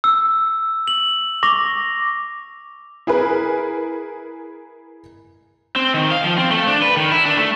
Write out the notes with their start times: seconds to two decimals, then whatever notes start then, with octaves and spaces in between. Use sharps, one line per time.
0.04 E6
0.88 F#7
1.43 C#6 D6 A#6 F7
3.07 E4 G#4 A#4 B4
5.76 C4
5.94 D#3
6.11 F5
6.24 F3
6.38 C4
6.51 A3
6.67 D4
6.82 B4
6.97 D#3
7.12 E4
7.26 D4
7.37 A3